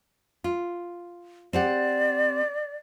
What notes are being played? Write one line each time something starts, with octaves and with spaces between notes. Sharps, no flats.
F4
C4 G4 D5 F#5